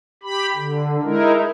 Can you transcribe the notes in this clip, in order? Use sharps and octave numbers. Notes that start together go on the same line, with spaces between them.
G4 B5
D3
G#3 D#4 E4 A#4